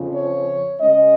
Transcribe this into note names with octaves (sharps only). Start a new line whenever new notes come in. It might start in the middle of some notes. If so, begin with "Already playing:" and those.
Already playing: F2 C#3 F3
C#5
C#3 G#3 C#4 D#5